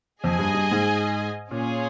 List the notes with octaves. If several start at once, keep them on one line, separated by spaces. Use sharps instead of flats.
F2 G#4 D#5 G#5
G2
G2
G#2
A#2 C#4 F4 G#4